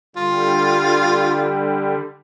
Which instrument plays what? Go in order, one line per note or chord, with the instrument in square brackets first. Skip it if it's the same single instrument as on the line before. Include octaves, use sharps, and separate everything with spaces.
[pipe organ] D3 G3 [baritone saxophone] F4